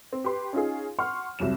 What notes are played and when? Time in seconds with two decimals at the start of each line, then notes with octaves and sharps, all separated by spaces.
0.12 C4
0.24 G4 B4 C6
0.53 C#4 D#4 F4 G#4
0.99 F#5 C6 C#6 F6
1.39 C2 F2 F#3 E7